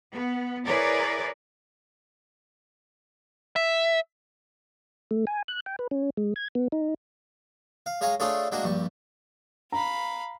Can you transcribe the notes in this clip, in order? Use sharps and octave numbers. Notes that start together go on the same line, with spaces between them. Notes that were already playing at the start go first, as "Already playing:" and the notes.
B3
E4 G#4 A#4 B4 C#5 D5
E5
A3
G#5
F#6
G5
B4
C#4
G#3
G#6
B3
D#4
F5
G#3 C#5 F5 G#5 A#5 C#6
A3 D4 F4 G#4 A4 C#5
G#3 A#3 D4 F#4
A#1 G2 C#6
F5 A#5 B5